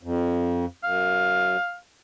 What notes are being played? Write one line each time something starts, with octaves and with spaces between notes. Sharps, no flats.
F2
F#2 F5